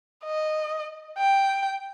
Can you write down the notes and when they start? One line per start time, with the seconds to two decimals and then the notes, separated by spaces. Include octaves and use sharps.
0.25 D#5
1.18 G5